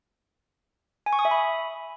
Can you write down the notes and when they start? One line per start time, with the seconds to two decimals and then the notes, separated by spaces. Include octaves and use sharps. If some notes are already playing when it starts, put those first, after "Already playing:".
1.06 G#5
1.13 C#6
1.19 D#6
1.25 E5
1.31 B5